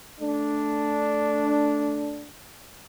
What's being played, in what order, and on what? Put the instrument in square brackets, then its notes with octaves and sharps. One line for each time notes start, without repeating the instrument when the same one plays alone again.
[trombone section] A3 D4